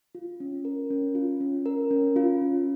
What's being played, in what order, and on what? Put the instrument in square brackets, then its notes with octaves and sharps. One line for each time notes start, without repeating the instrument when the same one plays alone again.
[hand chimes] F4
C#4
A#4
C#4
F4
C#4
A#4
C#4
F4
C#4